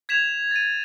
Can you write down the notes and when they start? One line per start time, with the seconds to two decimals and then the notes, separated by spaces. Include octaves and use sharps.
0.09 G#6 B6 E7 F7
0.51 A6 D#7